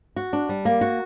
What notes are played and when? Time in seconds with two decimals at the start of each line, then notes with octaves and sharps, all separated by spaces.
0.16 F#4
0.33 D4
0.49 G3
0.65 A#3
0.81 F#4